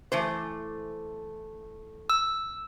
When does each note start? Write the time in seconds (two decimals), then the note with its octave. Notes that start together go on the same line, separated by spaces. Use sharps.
0.12 E3 A3 C5
2.10 E6